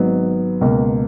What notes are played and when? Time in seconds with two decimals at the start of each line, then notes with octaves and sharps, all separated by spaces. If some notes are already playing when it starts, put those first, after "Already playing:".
Already playing: G#1 G#2 F#3 B3
0.61 C#2 B2 A#3